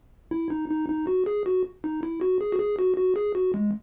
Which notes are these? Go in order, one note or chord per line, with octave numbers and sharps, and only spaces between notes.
E4
D#4
D#4
D#4
F#4
G#4
F#4
D#4
E4
F#4
G#4
F#4
G#4
F#4
F#4
G#4
F#4
G#3